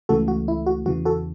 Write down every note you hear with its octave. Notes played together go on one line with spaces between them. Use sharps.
C#2 C#3 E3 A3 F#4 A4
F#4
E4
F#4
E2 C#3 E3 F#4
F#4 A4